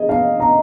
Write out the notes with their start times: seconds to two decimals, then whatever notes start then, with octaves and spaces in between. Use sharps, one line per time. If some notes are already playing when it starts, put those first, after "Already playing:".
Already playing: G#4 D#5
0.09 F5
0.40 A#5